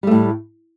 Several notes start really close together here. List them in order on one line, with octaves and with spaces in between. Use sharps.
G3 A3 A2